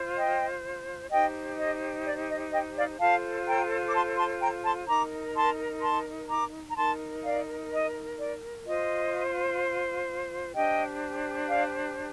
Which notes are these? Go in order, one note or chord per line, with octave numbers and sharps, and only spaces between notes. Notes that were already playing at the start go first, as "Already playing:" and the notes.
Already playing: F4 C5
D#5 G5
D#4 G4 C5 D#5 G5
D#5
D5
D#5
D#5 G5
D5 F5
F4 A4 C5 F5 A5
G5 A#5
D6
A5 C6
A5 C6
G5 A#5
A5 C6
D#4 A#4 A#5 D6
A5 C6
A5 C6
A#5 D6
A#5
D#4 A#4 A5 C6
D5 F5
D#5
D5
F4 C5 D#5
D4 G4 C5 D#5 G5
D5 F5